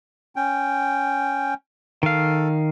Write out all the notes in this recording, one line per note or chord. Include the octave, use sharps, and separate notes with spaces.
C#4 G5
D#3 A4 F5